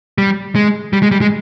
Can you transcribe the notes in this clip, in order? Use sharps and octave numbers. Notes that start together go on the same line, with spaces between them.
G3
G#3
G3
G#3
G3
G#3